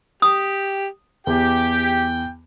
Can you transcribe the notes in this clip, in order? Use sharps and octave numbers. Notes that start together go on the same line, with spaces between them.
G4 D#6
E2 G4 G5